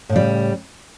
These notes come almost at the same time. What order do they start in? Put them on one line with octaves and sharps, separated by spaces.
A2 C#3 G3